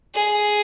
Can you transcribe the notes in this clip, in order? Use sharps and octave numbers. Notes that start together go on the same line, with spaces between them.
G#4